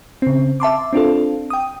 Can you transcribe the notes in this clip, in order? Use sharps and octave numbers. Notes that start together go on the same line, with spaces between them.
C#3 C4
E5 A5 C6 D6
C4 D4 F4 A4
G5 D#6